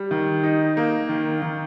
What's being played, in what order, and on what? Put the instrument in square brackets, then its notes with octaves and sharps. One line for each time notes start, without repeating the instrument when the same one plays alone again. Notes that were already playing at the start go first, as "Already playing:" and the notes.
Already playing: [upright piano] G3
D#3
D#4
A#3
D#3
D#3